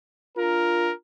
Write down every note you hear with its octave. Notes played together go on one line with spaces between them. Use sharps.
D4 F4 A#4